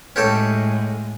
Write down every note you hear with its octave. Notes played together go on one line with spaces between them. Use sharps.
A2 G#3 C#4 G4 A4